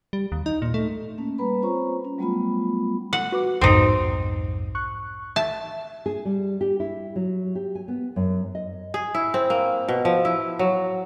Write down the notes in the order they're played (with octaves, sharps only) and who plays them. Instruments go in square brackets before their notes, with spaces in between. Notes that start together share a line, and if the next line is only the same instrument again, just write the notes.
[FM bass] G3
D#2
D#4
A#2
A3
[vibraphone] A3 A#3 C#4
G3 A#3 B4 A#5 B5
C4 F4 C5 C#5 A#5 C#6
C#4
F#3 G3 A3 B3 F4 B5
[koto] F#5
[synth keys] F#4 B4 D6
[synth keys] B1 F2 G#2 [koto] C4 D#4
[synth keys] C#6 F#6
[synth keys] E5 [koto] A5
[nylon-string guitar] G#4
G3
G4
E4
F#3
G4
G#5
B3
F#2
D#5
[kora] G#4
E4
C4
A#3
B2
F3
E4
F#3